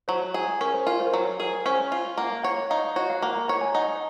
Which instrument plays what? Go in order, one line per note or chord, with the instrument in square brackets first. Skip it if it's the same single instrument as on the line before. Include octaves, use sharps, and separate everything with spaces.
[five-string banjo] F#3 [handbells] C5
[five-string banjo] G#4
[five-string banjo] C#4 [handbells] A#4
[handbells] C5
[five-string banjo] F4 [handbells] A#4
[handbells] C5
A#4
[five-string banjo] F#3 [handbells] C5
[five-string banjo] G#4 [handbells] A#4
[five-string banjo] C#4 [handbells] C5
[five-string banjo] F4
[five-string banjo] A#3 [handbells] F#5
[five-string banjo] C#5 [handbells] F#5
[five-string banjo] D#4 [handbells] F5
[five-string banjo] F#4 [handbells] C#5
[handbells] F5
[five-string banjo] A#3 [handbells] F#5
[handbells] A#5
[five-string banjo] C#5 [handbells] A#5
[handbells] G#5
[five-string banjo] D#4 [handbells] F#5